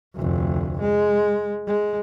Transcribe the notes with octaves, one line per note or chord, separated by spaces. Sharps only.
F1 D2
G#3
G#3